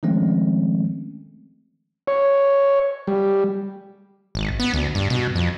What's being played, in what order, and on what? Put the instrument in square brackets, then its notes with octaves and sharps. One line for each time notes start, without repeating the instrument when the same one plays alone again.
[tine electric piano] D#3 F3 G#3 A3 C4 C#4
[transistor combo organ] C#5
G3
[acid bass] G#1
B3
D2
G2
B2
F2